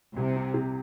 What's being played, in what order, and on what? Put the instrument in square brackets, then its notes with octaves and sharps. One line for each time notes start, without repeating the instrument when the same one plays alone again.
[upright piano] C2 [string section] C3
[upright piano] C4
C3